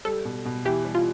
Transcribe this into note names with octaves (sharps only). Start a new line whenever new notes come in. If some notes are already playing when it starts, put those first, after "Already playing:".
G3 A4
B2
B2
E3 G4
G3
F4